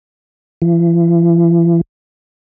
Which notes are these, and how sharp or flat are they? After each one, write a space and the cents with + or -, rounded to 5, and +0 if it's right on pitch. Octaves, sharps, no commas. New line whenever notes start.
E3 +45